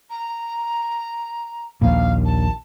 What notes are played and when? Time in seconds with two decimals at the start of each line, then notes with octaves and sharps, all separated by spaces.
0.10 A#5
1.82 A#1 D#2 F5
2.25 A5